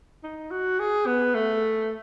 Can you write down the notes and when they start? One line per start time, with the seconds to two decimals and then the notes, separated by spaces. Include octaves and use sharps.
0.23 D#4
0.51 F#4
0.79 G#4
1.07 B3
1.35 A3